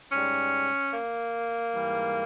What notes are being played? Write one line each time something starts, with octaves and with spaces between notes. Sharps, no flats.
G#2 G3 C#4
A#3
G#2 E3 G3